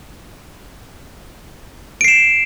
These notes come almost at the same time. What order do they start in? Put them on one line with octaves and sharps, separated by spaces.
D7 C7 E7